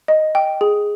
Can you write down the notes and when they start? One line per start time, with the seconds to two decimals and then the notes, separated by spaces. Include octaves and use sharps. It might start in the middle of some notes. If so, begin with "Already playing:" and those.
0.08 D#5
0.35 G5
0.61 G#4